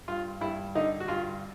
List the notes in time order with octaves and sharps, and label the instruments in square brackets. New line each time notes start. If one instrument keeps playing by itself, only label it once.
[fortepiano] G2 F4
G2 E4
D3 D#4
F#4
G2 F4